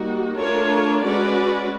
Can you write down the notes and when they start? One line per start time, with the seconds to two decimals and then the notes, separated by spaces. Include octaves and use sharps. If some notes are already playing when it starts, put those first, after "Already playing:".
Already playing: G3 A#3 D#4 F#4
0.37 A3 D4 F4 A#4 C#5
1.02 G#3 C#4 F#4 B4 D5